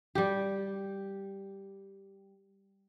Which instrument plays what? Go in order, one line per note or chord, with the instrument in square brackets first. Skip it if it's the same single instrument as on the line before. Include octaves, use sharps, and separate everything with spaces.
[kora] G3 G4